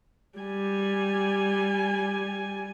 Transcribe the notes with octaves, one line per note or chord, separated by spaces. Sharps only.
G3 G#5